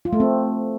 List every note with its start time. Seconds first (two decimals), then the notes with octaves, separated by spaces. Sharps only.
0.05 F4
0.13 A3
0.20 C4